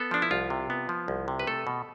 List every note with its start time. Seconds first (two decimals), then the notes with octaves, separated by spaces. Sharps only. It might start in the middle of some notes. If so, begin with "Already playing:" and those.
Already playing: B3 A4
0.11 F3 D4
0.22 E4
0.31 C2 F4
0.50 C3
0.70 B3
0.89 F3
1.08 C2
1.28 C3
1.39 B4
1.47 A3 A4
1.67 B2